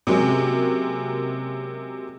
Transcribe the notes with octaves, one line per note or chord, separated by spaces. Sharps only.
C3 F#3 G#3 A#3 C#4